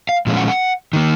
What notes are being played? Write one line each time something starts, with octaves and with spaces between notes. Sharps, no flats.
F5
A#2 F3 G#3 C#4
F#5
F#5
D#3 A#3